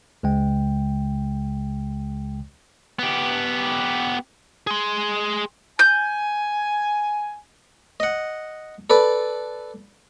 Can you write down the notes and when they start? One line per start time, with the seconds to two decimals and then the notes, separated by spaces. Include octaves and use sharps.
0.23 C#2 C#3 G#3 G5
2.99 B3 G4
4.67 G#4 C6
5.79 G#5 G6
8.00 D#5 F#5
8.90 A4 B4 D5